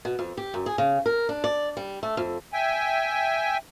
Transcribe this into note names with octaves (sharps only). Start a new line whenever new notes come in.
B2
F2
G4
F#2
G#4
C#3
A#4
D4
D5
G3
A3
F2
E5 G5 G#5